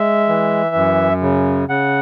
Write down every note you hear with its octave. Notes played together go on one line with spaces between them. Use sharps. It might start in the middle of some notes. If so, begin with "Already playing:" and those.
Already playing: G#3 E5
E3
F#2
C#3
C#3 F#5